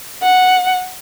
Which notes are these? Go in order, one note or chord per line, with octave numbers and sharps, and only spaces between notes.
F#5